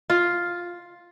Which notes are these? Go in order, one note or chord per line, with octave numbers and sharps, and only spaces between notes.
F4